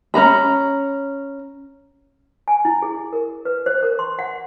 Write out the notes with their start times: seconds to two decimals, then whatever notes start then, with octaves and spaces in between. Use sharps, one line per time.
0.14 C#4 C5 A#5 B5
2.48 G#5
2.65 E4
2.82 G#4
3.13 A#4
3.45 B4
3.66 C5
3.83 A#4
3.99 C6
4.19 F#5